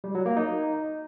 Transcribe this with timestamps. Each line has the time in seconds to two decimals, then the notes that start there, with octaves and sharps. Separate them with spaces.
0.04 G3
0.15 F#3
0.26 A#3
0.37 D#4